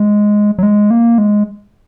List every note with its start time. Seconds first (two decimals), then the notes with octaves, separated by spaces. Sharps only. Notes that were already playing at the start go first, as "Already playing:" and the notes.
Already playing: G#3
0.59 F#3
0.63 G#3
0.91 A#3
1.18 G#3